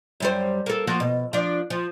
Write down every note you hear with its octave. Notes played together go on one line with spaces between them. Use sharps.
F#2 G3 C5
A#3 A4
F3 A#3 F#4
B2
F3 D4
F3